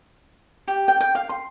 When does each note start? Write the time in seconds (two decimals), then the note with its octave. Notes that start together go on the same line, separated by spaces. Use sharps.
0.68 G4
0.88 G5
1.00 G5
1.15 F5
1.29 C6